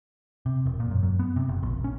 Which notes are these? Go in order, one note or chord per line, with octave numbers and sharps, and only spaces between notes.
C3
E1
A#2
F#2
F#2
B3
C3
F#1
A#1
C#4